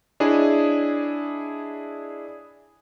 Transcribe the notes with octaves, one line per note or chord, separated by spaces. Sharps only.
D4 E4 G#4 C#5 D#5